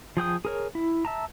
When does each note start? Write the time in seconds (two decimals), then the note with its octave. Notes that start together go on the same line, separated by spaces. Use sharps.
0.17 F3 G#4 G5 D#6
0.45 G#4 A#4 C#5
0.75 E4
1.05 E5 A5 A#5